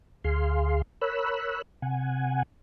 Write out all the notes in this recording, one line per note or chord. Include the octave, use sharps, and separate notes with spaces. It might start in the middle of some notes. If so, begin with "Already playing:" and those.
D2 G#4 F5 C6
A#4 C#5 B5 E6 F#6
C3 F#5 G#5